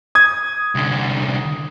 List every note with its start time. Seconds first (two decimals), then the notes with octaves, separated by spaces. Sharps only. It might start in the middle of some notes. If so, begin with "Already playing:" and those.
0.15 D#6 G#6
0.75 C2 D3